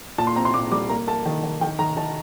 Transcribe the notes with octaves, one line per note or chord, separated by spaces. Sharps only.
A#2 A5
C6
C4 A#5
C6
A#2 D6
G3 D6
A#3 A#5
A#3 A5
D#3
D#3
D#3 G5
D#3 A#5
D#3 A5